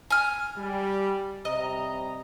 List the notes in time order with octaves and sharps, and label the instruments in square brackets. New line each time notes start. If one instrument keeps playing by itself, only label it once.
[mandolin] G#5 F6
[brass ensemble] G3
[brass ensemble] C3 G3 A#5 [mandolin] D#5